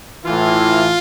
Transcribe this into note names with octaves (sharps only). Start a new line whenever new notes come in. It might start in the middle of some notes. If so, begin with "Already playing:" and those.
A2 E3 F4